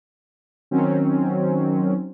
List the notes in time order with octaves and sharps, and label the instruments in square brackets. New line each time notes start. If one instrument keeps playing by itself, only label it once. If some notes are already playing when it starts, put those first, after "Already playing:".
[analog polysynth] D#3 F#3 C4 C#4